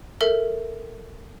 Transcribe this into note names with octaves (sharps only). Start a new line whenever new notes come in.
A4 A#4 E5